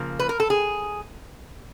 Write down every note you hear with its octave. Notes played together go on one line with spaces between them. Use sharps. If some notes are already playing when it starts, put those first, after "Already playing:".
Already playing: C#3 F3 A#3
B4
A#4
A4
G#4